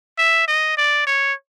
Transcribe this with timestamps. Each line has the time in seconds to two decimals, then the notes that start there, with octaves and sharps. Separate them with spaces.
0.18 E5
0.48 D#5
0.77 D5
1.07 C#5